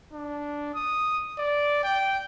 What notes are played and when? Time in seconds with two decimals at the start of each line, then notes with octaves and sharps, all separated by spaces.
0.13 D4
0.75 D#6
1.39 D5
1.84 G5